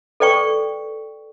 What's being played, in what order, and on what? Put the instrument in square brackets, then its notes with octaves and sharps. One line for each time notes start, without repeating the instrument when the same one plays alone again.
[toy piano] A4 B4 D5 G5 C#6